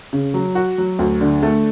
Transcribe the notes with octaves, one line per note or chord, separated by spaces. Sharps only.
C#3
F#3
F#4
F#3
D2
D3
A3